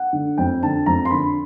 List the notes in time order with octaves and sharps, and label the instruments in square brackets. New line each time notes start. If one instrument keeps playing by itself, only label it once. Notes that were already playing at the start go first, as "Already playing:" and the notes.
Already playing: [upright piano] F#5
D3
F2 G5
D3 A5
F2 A#5
C6
D3 B5